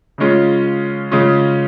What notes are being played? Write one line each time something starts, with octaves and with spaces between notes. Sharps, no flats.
C#3 G#3 C#4 F4
C#3 G#3 C#4 F4